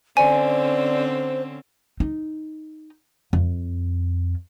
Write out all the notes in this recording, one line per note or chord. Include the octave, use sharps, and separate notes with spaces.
D3 C4 C#4 C5 D5 G#5
D#4
F2